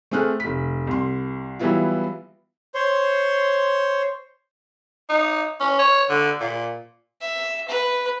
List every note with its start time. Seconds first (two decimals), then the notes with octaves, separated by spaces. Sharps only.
0.11 A3 C4 G#4 F6 F#6
0.40 F1 B6
0.87 C2 C6
1.59 E3 F#3 G3 B3 E4 F4
2.75 C5 C#5 C6
5.09 D#4
5.60 C#4
5.79 C#5
6.09 D3
6.40 A#2
7.21 E5
7.68 B4